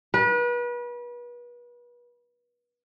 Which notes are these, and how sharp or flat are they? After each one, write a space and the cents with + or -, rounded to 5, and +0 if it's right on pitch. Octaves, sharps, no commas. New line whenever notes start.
B4 -35